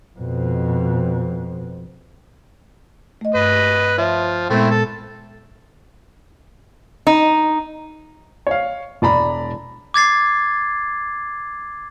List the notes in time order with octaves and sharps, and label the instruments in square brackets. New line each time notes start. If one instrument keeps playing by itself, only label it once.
[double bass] F2 B2
[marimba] A3 D#5
[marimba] G2 [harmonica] B4 D#5
[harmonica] F3 [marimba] C#5 E5
[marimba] A#2 G#3 B3 [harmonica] A3 C4 E4
[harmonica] A4
[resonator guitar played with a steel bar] D#4
[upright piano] C#5 F5
E1 D5 A#5 B5
[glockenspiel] D6 G#6 A6 C7